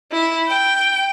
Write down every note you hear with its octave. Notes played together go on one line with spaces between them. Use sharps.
E4
G5